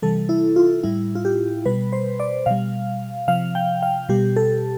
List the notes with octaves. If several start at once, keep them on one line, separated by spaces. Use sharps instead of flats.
C3 E3 G3 A4
E4
F4
A2 G3 E4
F4
G4
B2 G3 B4
C5
D5
B2 G3 F5
C3 F3 F5
G5
F5
B2 G3 G4
A4